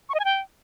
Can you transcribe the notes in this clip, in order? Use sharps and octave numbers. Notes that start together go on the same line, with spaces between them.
C#6
D#5
G#5
G5